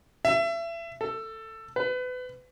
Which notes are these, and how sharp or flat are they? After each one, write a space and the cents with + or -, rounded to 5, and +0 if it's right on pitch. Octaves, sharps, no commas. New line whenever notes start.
E5 +30
A4 +15
B4 +30